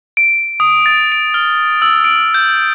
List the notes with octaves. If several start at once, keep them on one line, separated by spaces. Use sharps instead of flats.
D7
D#6
A6
D7
F6
E6
D7
G6